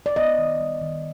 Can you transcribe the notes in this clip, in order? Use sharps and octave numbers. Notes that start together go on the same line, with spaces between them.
D5
B3 D#5
D#3
G3
D#3